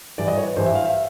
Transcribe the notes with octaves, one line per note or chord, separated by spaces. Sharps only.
G2 E3 G3 D5
D#5
C#5
B4
G2 E3 G3 C5
E5
F5
E5